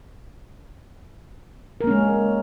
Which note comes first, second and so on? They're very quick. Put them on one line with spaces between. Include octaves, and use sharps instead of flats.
A#4 A#3 C#4 G#3